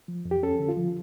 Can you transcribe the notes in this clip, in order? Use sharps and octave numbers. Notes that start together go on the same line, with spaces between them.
F3
F2
G4
C#4 A4
D3
F4
F3